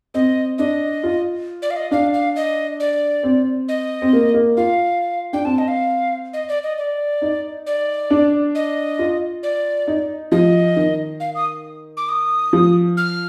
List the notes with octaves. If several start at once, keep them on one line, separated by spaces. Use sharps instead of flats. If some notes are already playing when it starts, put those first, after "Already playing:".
C4 D#5
D4 D#5
F4
D5
F5
D#5
D4 F5
F5
D#5
D5
C4
D#5
C4
A#3
A#3
F4 F5
D4 G5
C4 A5
D#5
F5
D#5
D5
D#5
D5
D#4
D5
D4
D#5
F4
D5
D#4
F3 D#5
D#3
F5
D#6
D6
D#6
F3
F6